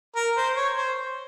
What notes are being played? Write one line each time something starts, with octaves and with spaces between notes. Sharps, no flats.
A#4
C5
C#5
C5